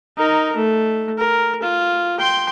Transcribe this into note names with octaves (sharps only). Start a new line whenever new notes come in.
D#4 A#4
A3
A#4
F4
G5 C6